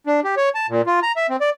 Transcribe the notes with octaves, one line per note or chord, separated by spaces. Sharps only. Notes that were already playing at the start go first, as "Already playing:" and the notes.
D4
G4
C#5
A5
A#2
F4
A#5
E5
C4
D5